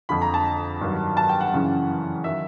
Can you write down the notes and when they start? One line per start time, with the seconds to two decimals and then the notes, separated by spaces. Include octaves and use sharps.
0.09 F2 D3 F3 B5
0.22 A#5
0.34 A5
0.81 G2 D#3 F#3
1.17 A5
1.29 G5
1.41 F#5
1.53 F#2 C#3 E3
2.24 D#3 F#3 E5